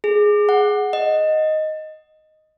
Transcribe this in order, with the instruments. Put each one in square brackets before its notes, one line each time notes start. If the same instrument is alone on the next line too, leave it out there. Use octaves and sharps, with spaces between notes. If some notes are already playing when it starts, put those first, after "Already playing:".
[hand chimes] G#4
F#5
D#5